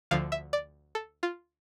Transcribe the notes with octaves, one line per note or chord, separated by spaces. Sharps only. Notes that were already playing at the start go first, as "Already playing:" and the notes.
D2 D3 F3 F5
E5
D5
A4
F4